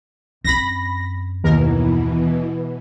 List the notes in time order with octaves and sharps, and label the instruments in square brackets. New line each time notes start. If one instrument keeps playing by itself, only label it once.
[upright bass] F#2 C4 [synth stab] B5 A#6
[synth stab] D#2 A#4 [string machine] B2 E3